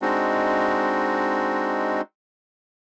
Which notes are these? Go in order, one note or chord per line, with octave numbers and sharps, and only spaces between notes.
G#3 C4 D4 D#4 F#4